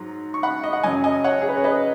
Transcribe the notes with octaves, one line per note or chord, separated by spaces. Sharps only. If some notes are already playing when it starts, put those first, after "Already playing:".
Already playing: G#2 F#3
C#6
F#5 B5
D#5
F#5
F#2 C#3 F#3 D#5 G#5
D#5 G#5
C#5 F#5
G#4
B4
C#5
B4 D#5